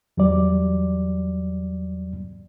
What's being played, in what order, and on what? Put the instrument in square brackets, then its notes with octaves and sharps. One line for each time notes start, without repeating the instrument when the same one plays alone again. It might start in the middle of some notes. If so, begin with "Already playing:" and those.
[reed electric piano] E2 F#3 G3 D5